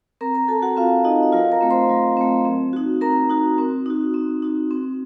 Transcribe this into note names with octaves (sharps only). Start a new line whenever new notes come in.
C4 A#4 A#5
A#4 A#5
F#4 A4 A5
F#4 F#5
C4 F4 F5
D#4 F#4 D#5
D#5
F#3 F4 F5
A#4 A#5
A3 C4
C5 C6
F#3
A3 C4
C4
D#4 F#4
C4 A#4 A#5
D#4 F#4
C4
D#4 F#4
C4
D#4 F#4
C4